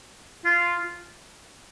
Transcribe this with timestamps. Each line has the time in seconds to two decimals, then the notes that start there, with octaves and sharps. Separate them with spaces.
0.45 F4